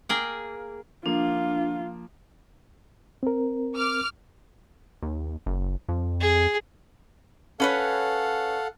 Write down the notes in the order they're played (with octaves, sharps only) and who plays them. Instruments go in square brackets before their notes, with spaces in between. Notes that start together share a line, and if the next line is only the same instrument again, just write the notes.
[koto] A#3 G#4 G5
[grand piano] F3 A#3 [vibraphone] D4 [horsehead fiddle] F4
[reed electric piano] C4 A#4
[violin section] D6 F6
[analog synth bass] D#2
F#1
F2
[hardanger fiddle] G#4
[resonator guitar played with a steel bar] C#4 B4 C#5 [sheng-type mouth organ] A4 F5 F#5